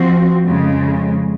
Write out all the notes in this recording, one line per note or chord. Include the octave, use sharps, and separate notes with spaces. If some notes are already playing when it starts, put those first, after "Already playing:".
Already playing: F3 C4 F#4
F2 C#3 G#3